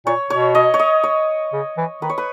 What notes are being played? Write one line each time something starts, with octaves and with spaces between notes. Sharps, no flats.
A#2 C#5
B2 C#5
D#5
C#5
D#5
C#5
C#3
E3
D#3 B4
C#5
B4